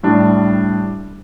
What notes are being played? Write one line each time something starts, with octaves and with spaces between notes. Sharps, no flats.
A2 G3 D4